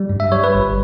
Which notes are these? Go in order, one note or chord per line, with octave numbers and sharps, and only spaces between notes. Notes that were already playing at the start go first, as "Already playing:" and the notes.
Already playing: G3
G2
E5
G3 C#5
B4
G1